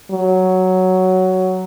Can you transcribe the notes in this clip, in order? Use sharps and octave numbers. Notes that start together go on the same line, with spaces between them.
F#3